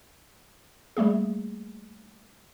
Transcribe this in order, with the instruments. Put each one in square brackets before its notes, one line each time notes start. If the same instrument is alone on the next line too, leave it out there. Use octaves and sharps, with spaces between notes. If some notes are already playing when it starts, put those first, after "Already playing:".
[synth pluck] G3 A3 A#3 G#4